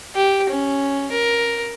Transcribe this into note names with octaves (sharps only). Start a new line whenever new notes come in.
G4
C#4
A#4